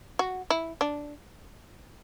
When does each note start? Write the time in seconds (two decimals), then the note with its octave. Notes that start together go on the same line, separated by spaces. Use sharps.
0.19 F#4
0.50 E4
0.81 D4